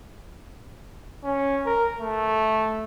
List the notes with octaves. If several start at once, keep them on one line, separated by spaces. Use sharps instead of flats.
C#4
A#4
A3